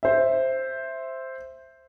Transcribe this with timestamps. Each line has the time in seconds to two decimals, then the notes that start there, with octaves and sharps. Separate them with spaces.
0.03 C5 E5